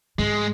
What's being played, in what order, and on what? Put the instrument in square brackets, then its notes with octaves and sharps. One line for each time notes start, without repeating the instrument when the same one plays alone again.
[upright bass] G#2 [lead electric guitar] G#3